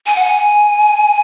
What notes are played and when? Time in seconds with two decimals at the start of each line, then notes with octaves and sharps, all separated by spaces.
0.06 G#5
0.16 F#5
0.24 G#5